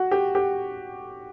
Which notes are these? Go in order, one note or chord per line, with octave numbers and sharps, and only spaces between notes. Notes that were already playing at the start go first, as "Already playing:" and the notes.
Already playing: F#4
G4
G4